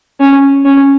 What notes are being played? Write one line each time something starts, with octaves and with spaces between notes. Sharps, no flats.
C#4
C#4